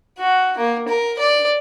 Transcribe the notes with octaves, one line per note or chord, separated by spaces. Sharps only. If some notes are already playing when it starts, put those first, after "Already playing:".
F#4
A#3
A#4
D5